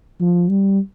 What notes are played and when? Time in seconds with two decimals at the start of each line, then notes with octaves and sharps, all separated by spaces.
0.21 F3
0.49 G3